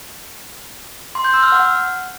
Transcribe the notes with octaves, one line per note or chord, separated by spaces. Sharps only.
C6
G6
E6
F6
F#5